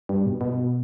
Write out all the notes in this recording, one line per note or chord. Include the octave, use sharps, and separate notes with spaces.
G2
B2
B2